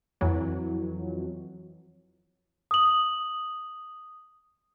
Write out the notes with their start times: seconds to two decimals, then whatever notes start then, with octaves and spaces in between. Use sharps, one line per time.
0.21 F2 E3 F#3
2.71 D#6 F#7